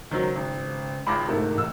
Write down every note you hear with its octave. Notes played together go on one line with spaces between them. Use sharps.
C#2 D#3 F#3 C#4 C5
G#1
G#1 C#2 B5 D6 A#6
G1 G#2 C3 A3 A#4
A1 E6